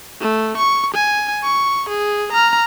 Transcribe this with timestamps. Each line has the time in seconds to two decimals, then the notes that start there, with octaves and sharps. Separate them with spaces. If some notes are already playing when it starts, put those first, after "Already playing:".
0.21 A3
0.57 C#6
0.94 G#5
1.43 C#6
1.89 G#4
2.32 A#5 F6